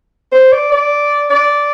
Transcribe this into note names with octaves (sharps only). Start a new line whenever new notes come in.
C5
D5
D5
D5